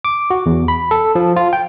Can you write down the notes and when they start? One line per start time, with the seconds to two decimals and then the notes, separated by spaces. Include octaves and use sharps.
0.05 D6
0.30 F#4
0.46 E2
0.68 B5
0.91 A4
1.15 F3
1.36 F4
1.53 G5